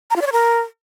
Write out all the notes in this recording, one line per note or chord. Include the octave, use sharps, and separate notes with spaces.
A#5
F4
D5
C#5
A#4